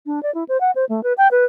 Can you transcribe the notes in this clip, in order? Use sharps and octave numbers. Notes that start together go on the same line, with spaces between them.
D4
D5
E4
C5
F#5
C5
A3
B4
G5
B4